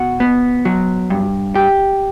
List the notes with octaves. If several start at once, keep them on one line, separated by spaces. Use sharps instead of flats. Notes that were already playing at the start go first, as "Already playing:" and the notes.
Already playing: B2 F#4
B3
F#3
G2
G4